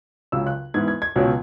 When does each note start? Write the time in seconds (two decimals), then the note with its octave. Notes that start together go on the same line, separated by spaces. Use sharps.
0.32 C#2 C#3 F#3 E6
0.47 F#6
0.74 G#2 E3 B3 G#6
0.88 G#6
1.02 G#6
1.16 C#2 B2 F#3 C#4